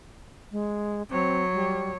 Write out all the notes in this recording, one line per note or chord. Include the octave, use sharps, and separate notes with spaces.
G#3
F#3 C4 C#5
G3